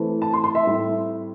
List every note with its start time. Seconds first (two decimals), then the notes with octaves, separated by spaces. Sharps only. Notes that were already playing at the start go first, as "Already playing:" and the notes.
Already playing: E3 A3 C4
0.22 A5
0.34 C6
0.44 C6
0.55 E5
0.65 A2 G3 C4